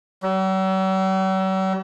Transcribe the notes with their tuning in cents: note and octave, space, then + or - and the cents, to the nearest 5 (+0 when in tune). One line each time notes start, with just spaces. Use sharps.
F#3 +45